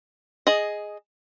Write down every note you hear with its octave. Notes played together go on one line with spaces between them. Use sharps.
G#4 D#5